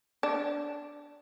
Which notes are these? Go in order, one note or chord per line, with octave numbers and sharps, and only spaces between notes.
D4